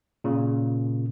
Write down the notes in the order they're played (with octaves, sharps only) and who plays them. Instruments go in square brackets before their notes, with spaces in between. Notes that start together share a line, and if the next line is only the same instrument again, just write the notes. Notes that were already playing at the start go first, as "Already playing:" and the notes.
[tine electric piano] A#2 C#3